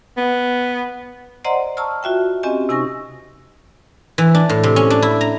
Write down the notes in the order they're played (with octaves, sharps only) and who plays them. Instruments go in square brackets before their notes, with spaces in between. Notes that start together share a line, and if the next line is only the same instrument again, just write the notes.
[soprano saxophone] B3
[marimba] C5 D5 D#5 F#5 A#5 C6
A5 A#5 C#6 E6 F6
F4 F#4 E5 G5
C4 C#4 G4 D#5 G#5
C3 D#4 G#5 C#6 A#6
[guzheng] E3
D4
A2
C3
C#4
D4
E4
A#5